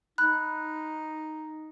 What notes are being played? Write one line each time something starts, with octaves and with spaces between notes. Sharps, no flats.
D#4 B5 F#6